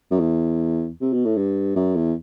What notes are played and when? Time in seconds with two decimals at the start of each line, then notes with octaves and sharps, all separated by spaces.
0.11 F#2
0.19 E2
1.01 C3
1.13 B2
1.25 A2
1.36 G2
1.76 F#2
1.95 E2